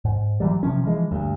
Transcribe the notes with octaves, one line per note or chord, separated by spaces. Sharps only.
G#2
E3 F#3 G3
C3 F3 C#4
E3 F3 G#3
D2 G2